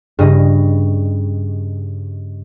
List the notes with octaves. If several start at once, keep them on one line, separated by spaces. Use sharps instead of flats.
G2 C#3 D#5